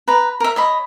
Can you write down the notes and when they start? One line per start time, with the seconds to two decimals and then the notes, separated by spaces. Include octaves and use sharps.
0.08 B4 A#5
0.40 A#4 E5
0.56 C#5 D#5 B5